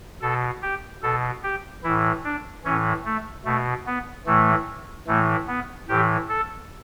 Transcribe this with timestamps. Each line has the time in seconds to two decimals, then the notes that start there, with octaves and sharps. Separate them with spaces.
0.22 B2 A4
0.62 G4
1.02 B2 A4
1.43 G4
1.84 A2 E3 E4
2.24 D4
2.64 A2 E3 C#4
3.05 A3
3.45 B2 A3
3.86 B3
4.26 A2 E3 A3
5.07 A2 E3 A3
5.47 B3
5.88 A2 E3 G4
6.28 A4